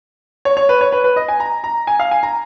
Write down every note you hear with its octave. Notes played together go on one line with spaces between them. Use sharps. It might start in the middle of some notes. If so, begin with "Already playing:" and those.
C#5
C#5
B4
C#5
B4
B4
D#5
G#5
A#5
A#5
G#5
F5
G#5
A#5